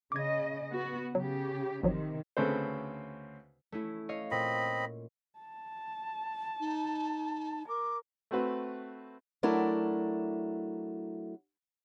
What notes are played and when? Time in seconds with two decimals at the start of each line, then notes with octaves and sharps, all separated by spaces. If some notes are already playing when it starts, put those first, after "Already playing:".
0.12 C#3 D#5 D6 G#6
0.72 B3 F#4
1.15 C#3 F#3 G4
1.84 G#1 C3 D#3 F3 F#3
2.37 D2 C#3 C4 A4 B4 C5
3.72 A3 C#4 E4
4.09 C#5 D#5 F5
4.31 A#2 C4 D#5 B5
5.39 A5
6.60 D#4
7.69 A#4 D6
8.31 A3 C4 F#4 B4
9.43 F#3 A3 D4 E4 A#4